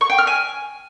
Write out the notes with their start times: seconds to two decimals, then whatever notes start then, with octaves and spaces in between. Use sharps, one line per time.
0.01 C#6
0.10 G5
0.18 F6
0.27 G#5